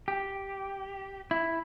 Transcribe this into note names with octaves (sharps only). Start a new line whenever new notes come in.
G4
E4